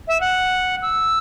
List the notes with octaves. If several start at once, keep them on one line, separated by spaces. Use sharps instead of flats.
E5
F#5
E6